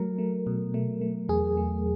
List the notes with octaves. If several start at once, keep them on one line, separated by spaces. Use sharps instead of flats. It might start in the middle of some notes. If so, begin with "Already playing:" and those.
Already playing: F#3 A3 A#4
A3
B2
A3
A3
E2 G#4
A3